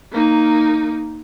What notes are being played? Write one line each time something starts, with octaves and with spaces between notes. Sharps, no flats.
A#3 D#4